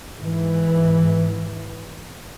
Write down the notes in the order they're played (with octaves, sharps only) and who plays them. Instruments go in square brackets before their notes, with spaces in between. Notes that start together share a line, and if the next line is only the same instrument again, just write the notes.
[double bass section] G#2 E3